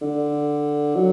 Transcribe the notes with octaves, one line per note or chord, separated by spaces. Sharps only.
D3
F#3